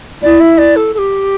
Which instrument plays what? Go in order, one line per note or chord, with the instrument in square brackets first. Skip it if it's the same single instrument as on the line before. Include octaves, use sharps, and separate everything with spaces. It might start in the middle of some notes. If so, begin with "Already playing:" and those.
[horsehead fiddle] E4 [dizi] D5
[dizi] E5
D5
A4
A4
G4